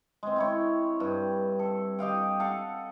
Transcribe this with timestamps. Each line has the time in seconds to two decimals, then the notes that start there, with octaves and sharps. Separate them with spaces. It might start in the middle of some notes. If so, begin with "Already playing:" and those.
0.23 G#3 C4
0.36 C4 E4 C#5
1.00 G2
1.59 A4
1.99 G4 D#5 F5 G5
2.40 A4 F5 F#5